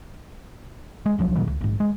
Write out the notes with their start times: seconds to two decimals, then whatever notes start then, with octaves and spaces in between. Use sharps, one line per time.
1.06 G#3
1.18 D#1 C2 F3 F#3
1.36 E2 A#2 D#3 F#3
1.47 C#2
1.61 A#1 G#2
1.80 G#3